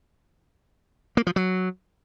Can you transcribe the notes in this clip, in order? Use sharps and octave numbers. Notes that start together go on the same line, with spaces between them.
A#3
F3
F#3